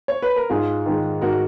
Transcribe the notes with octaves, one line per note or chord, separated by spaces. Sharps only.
C#5
B4
A#4
G#2 F4 G#4
D#3 G#3
G#2 F#4 A#4